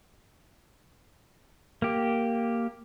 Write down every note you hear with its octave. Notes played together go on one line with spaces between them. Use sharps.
A#3 G4